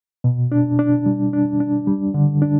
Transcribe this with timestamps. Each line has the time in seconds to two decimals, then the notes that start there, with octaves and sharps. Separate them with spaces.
0.24 B2
0.52 D4
0.79 D4
1.06 G3
1.33 D4
1.60 D4
1.87 G3
2.14 D3
2.42 D4